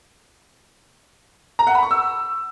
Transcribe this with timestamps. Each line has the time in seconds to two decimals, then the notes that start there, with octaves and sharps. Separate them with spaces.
1.59 A#5
1.67 F#5
1.75 B5
1.83 C#6
1.91 E6